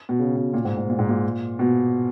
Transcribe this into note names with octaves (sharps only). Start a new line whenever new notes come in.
B2
C#3
B2
A#2
G#2
G#2
A#2
G#2
A#2
B2